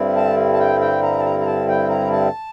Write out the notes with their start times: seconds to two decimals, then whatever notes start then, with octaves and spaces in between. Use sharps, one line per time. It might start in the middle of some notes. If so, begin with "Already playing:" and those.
Already playing: G2 D3 G3 C4 E4
0.16 A5
0.54 A5
0.59 G5
0.81 G5
1.03 A#5
1.19 A5
1.25 A#5
1.40 A#5
1.46 A5
1.68 G5
1.89 A#5
2.11 A5